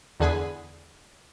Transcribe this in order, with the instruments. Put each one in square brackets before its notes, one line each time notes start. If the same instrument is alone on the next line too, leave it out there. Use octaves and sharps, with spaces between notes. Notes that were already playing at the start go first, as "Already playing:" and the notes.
[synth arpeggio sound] E2 D3 G#4 G#5 B5